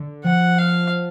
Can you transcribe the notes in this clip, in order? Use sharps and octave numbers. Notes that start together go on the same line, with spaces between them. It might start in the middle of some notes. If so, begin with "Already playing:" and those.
Already playing: D3
F3 F#5
F5